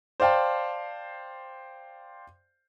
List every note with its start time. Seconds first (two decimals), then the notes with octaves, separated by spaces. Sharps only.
0.20 C5 D5 F5 G5 A5